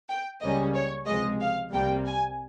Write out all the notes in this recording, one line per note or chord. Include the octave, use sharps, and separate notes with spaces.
G5
C#2 C#3 G3 A#3 C#4 D#5
C#5
C#2 C3 F3 G#3 D#5
F5
C2 C3 G3 A#3 G5
G#5